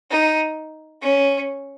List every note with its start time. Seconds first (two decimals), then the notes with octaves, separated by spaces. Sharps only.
0.10 D#4
1.02 C#4